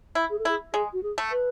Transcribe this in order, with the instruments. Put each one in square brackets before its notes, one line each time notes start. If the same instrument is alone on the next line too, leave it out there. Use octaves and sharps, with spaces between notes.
[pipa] E4
[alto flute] G#4
A4
[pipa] E4 [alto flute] G#4
[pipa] G#3 [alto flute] G#4
[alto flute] F#4
G#4
[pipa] A3
[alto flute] B4